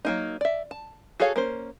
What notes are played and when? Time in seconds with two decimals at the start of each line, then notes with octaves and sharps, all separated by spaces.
0.05 F#3 A#3 D#4
0.41 D5 E5
0.71 A5
1.20 F#4 G#4 A4 C#5 F5
1.36 A#3 C#4 C5